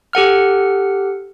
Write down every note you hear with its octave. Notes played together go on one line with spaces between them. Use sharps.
G4 A4 F#5 F6